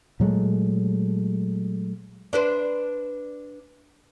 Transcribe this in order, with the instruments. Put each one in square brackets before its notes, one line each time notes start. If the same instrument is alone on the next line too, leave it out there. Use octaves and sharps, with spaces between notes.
[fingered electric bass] A#2 F#3 G#3 A3
[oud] D4 B4 C5